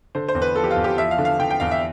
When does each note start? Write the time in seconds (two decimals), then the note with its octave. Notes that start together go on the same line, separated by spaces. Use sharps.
0.15 D3 C5
0.29 C5
0.35 E2
0.42 B4
0.56 F3 A4
0.64 G4
0.71 F4
0.76 E2
0.84 G4
0.98 F3 E5
1.11 F5
1.18 D3
1.25 F5
1.39 D3 G5
1.51 G5
1.60 E2 F5
1.71 E5